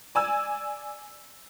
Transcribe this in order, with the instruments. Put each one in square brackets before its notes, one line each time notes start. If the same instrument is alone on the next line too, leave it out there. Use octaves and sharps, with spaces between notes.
[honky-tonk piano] D5 G#5 E6